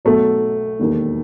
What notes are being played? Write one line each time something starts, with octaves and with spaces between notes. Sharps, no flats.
B1 B2 F#3 A3
E1 D#2 D#3